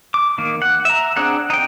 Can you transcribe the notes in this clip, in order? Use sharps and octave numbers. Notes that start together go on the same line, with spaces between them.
D6
D#3 A#3
F#5
E5 A#5
C4 D4 G#4 F#5
D#4 G5